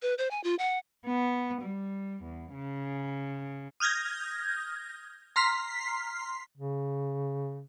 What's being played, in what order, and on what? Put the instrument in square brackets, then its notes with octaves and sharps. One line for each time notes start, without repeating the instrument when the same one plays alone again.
[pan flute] B4
C5
G#5
F4
F#5
[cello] B3
G3
E2
C#3
[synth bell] D#6 F6 G6 G#6 A#6
A#5 C6 F6 B6 C7
[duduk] C#3